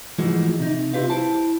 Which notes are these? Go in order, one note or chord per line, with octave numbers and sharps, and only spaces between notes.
G#2 E3 F3 G#3 A3 F#4
C3 D#4
E4 F4 G4 B4 F5
E4 C5 A5